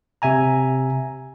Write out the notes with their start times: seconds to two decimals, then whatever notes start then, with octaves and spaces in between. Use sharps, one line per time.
0.22 C3 E5 G#5 A#5